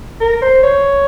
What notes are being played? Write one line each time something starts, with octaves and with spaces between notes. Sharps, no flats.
A#4
C5
C#5